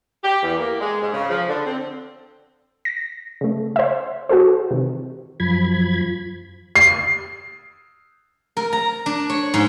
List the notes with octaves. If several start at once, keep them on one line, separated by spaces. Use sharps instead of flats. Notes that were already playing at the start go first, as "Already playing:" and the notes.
G4
E2
A#3
G#3
G#2
C#3
F3
D3
C4
A#6
C#3 A3
C5 E5
F#4 G#4 A4 C5
C3 D#3 E3
F#2 F3 B5 G#6
C7
A#4
A#5
D4
C#5
G#2